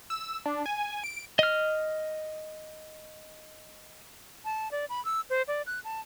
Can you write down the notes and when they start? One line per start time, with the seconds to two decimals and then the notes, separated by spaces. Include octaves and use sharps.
0.10 E6
0.46 D4
0.66 G#5
1.04 D7
1.39 D#5 F6
4.45 A5
4.71 D5
4.89 B5
5.05 E6
5.30 C5
5.48 D5
5.66 F#6
5.84 A5